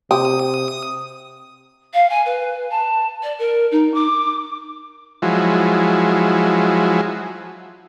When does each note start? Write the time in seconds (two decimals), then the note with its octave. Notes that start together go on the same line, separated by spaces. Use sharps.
0.11 C3 G4 D#6
1.93 F5
2.09 G#5
2.25 B4
2.70 A5
3.22 D5
3.38 A#4
3.71 D#4
3.93 D6
5.22 F3 F#3 G#3 E4